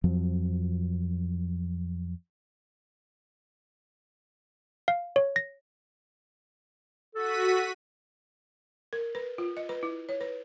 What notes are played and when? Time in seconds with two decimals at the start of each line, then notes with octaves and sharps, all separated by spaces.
0.04 F2 F3 F#3
4.88 F5
5.16 C#5
5.36 A#6
7.15 F#4 A4 B6 D#7
8.93 A#4
9.15 B4
9.38 F4
9.57 D#5
9.69 B4
9.83 E4
10.09 C#5
10.21 B4